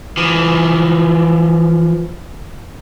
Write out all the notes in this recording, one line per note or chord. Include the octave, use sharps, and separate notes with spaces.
E3 F3